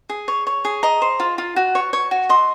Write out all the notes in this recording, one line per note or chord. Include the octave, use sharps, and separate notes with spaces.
G#4
C#5
C#5
G#4
D#5 A#5
C5
F4
F4
F#4
C#5
C#5
F#4
D#5 C6